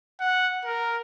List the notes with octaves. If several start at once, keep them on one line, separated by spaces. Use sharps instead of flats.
F#5
A#4